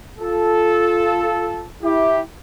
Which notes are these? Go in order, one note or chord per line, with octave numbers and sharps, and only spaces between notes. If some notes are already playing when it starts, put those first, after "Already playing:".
F4 A4
E4 G4